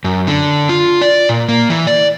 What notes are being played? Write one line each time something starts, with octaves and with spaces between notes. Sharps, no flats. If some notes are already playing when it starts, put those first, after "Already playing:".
F#2
D3
F4
D5
A#2
A#3
E3
D5